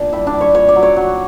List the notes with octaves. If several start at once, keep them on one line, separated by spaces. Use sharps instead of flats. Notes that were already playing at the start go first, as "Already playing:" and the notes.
Already playing: A#2 D4
G3 E4
D4
G3
C#5
A#2 C#5
D5
F#3
C#5
F#3